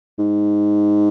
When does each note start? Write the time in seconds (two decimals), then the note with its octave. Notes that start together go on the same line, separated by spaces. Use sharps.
0.19 G#2